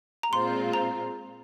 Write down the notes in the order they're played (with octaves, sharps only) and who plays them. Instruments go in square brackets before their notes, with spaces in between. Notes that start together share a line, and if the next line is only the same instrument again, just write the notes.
[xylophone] A#5
[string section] A#2 G#3 C4 F4 [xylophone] C6
[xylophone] A#5